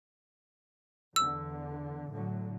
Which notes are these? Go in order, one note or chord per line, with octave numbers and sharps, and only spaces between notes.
E2 D3 E6
A2 D3 F#3